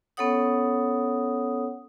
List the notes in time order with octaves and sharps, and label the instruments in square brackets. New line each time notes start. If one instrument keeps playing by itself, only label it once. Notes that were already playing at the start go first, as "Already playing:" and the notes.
[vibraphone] B3 C#4 A4 C#5 F#5 D#6